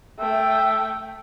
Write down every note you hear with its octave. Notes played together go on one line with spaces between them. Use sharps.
A3 E5 G5